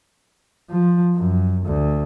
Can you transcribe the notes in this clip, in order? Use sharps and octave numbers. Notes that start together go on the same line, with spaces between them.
F3
F#2
D2